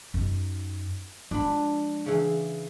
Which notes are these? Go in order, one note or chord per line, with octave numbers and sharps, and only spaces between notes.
F#2 D#4
F3 G#3 D4 B5
C#3 E3